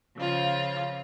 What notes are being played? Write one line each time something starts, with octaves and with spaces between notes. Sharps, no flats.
C#3 F3 F4